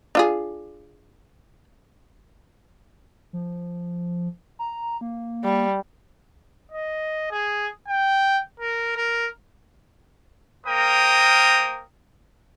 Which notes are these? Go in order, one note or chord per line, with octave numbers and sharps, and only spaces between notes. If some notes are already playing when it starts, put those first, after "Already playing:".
D4 F4 G#4
F3
A#5
A#3
G3
D#5
G#4
G5
A#4
A#4
A#3 A#4 C5 G5 A#5 D#6